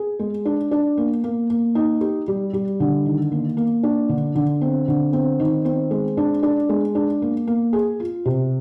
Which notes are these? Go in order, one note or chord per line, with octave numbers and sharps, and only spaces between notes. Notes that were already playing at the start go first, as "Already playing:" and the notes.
Already playing: G#4
G#3
D4
D4
A#3
A#3
A#3
D#4
G4
G3
G3
D3
D#3
A#3
A#3
D4
D3
D3
C4
D3
C4
D#3
C4
G#3
D4
D4
G#3
D4
A#3
A#3
G#4
F4
C3